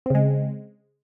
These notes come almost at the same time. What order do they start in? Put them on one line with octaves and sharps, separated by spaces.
C4 C#3 G#3